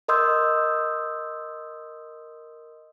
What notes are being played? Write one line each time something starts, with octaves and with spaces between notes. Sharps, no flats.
A#4 D#5 C6 D#6 E6 G6